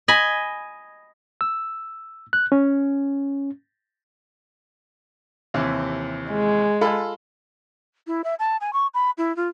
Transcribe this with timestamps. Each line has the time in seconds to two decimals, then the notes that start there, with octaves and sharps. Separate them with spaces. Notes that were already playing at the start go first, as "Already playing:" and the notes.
0.08 D#5 G#5 B5
1.41 E6
2.33 F#6
2.52 C#4
5.54 D#2 C3 E3
6.30 G#3
6.81 F4 A4 B5
8.07 E4
8.24 E5
8.39 A5
8.61 G#5
8.73 C#6
8.94 B5
9.18 E4
9.37 F4